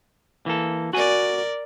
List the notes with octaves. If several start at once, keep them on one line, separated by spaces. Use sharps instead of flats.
E3 A#3 A4
F#4 A#4 D5 G#5